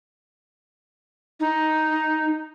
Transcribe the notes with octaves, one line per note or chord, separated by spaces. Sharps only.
D#4